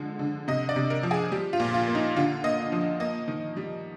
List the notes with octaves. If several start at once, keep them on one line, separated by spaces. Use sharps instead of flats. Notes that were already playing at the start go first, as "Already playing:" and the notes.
Already playing: D3 F3 G#3
D3
C3 D#5
D5
C3
A#4
F3
G#4
G3 G4
F4
A#2
F4
A#3
D#4
D3 F4
A#3 D#5
F3
A#3 D#5
D#3
G3